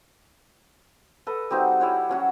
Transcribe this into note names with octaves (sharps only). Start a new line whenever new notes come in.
A4 B4 D#5
G3 C4 D#4 F#4
G3 E4 C#5 F#5
F#3 C#4 F#4